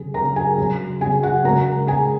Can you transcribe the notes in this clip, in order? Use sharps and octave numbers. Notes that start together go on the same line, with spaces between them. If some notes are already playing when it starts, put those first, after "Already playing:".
Already playing: C#3 F#3 G#4
C#3 F#3 A#4 A#5
G#4 G#5
C#3 F#3
C#3 F#3 G#4 G#5
F#4 F#5
C#3 G#3 A#4 A#5
C#3 G#3 G#4 G#5